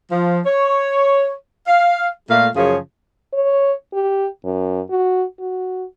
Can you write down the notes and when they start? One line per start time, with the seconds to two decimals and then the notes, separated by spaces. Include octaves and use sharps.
0.10 F3
0.45 C#5
1.66 F5
2.29 A#2 A3 F5
2.55 F#2 C#3 F3 F4 G#4 C#5
3.33 C#5
3.93 G4
4.45 F#2
4.90 F#4
5.39 F#4